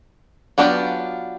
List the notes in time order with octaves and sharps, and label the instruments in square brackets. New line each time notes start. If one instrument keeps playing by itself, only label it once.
[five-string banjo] F#3 B3 D4 F4 G4